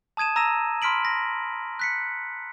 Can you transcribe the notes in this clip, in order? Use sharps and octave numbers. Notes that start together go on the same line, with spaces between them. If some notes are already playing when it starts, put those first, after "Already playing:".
A5 D#6 G#6 D#7 E7
A#5 E6 A#6 D#7 E7
B5 C6 F6 B6 D7 F#7
A#6
F#6 B6 C#7